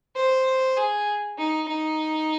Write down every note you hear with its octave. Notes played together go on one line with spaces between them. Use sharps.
C5
G#4
D#4
D#4